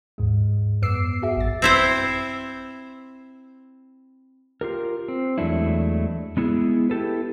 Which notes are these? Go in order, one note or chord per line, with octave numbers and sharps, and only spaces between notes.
D#2 G#2 G#3
F#2 B3 D6 E6 C7
F#4 G#4 E5
A1 F#2 A6
C4 E4 C5
F4 G4 A#4
C4
E2 F#3 G#3 A3 D4 E4
G#3 B3 E4 F#4 G#4
E4 G4 A4 B4